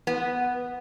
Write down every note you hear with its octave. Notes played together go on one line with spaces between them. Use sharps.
B3